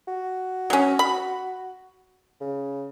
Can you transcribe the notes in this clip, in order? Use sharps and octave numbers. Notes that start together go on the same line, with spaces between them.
F#4
F#3 C#4
B5
C#3